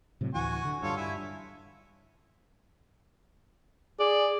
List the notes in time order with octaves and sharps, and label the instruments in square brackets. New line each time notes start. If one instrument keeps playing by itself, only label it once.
[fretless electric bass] A2 C3 F#3
[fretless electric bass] D2 A2 E3 [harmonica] F#4 G#5 C#6
[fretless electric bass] D3
[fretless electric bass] G2 [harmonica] F4 A4 C#5
[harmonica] E4 E5 G#5
[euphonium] G#4 [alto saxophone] D5